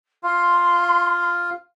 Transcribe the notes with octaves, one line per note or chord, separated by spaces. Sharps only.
F4 F5 C6